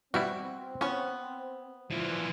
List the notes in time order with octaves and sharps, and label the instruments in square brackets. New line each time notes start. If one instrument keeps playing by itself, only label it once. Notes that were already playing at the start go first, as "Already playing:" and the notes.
[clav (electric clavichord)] B2 G3 E4 [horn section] C4 [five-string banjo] F#4
[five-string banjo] B3 C#5 [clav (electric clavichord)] C#4
[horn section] A#2 F3 [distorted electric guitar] E3 F4